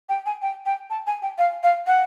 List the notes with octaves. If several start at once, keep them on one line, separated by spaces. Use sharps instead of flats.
G5
G#5
G5
G5
A5
G#5
G5
F5
F5
F#5